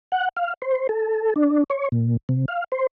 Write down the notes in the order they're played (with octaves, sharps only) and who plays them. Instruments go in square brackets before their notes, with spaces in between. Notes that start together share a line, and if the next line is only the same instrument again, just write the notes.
[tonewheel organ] F#5
F5
C5
A4
D4
C#5
A#2
C3
F5
C5